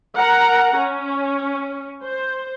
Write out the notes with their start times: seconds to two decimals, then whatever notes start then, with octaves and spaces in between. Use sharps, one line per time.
0.16 A#4 F#5 A#5
0.76 C#4
2.03 C5